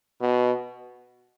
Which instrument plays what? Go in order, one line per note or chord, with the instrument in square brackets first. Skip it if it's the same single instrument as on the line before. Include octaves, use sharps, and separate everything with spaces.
[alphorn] B2